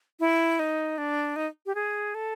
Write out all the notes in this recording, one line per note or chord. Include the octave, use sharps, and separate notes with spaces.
E4
D#4
D4
D#4
G4
G#4
A4